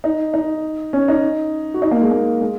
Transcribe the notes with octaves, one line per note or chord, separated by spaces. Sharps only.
D#4
D#4
C#4
D#4
F#4
D#4
A#3
G#3
A#3
G#3